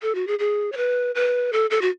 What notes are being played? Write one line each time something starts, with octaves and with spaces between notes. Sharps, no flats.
A4
F#4
G#4
G#4
C#5
B4
B4
A4
A4
F#4